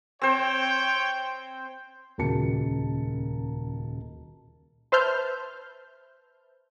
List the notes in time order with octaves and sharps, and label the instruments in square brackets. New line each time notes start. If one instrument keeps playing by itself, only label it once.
[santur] C4 C5 [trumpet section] C#5 G5
[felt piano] D#1 C#2 F#4 A#4 A5 C#7
[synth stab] B4 C5 E5 A5 F6 G6